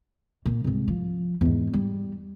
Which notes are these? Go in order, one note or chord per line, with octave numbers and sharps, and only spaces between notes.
A#2
C2 G#2
F3
E2 G#2
G3